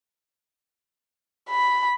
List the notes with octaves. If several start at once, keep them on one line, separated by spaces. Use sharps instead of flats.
B5